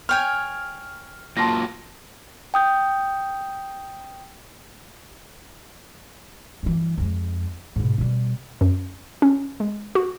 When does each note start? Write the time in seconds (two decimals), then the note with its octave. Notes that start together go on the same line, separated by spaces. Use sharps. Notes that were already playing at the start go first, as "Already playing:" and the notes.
0.09 C#5 G5 G#5 F6
1.37 F#3 A#3 F4 A5 C6 A#6
2.54 G5 D#6 G6
6.63 G2 E3
6.98 F2 G#3
7.76 G#2 B2
7.98 B2 G3
8.61 F#2
9.22 C#4
9.60 G#3
9.95 F#4